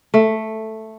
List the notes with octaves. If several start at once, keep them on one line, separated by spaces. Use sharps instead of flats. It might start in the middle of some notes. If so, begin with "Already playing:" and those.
A3